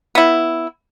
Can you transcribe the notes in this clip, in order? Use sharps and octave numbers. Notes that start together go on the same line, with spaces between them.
B3 E4